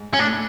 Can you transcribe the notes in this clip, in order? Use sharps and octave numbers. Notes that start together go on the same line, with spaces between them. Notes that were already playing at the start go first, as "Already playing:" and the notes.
Already playing: G#2
C#4
A2 D4
A2